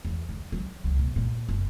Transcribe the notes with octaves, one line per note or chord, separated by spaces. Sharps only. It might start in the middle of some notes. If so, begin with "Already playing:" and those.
E2
D3
F#3
C#2
B2
A#2
F#1